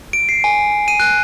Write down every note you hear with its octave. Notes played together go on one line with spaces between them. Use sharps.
D7
C7
G#5
D#7
F#6